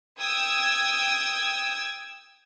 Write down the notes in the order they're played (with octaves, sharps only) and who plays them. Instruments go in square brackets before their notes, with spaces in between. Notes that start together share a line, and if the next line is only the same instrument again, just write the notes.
[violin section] G5 D#6 E6 G#6